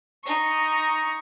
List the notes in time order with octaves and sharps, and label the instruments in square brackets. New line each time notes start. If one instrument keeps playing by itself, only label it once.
[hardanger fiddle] D#4 C#6